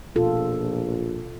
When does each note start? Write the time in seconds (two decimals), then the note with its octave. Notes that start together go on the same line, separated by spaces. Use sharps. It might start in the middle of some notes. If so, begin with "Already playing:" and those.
0.16 A#1 B2 F4 A4